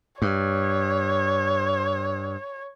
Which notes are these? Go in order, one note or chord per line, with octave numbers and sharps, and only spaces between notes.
G2 C#5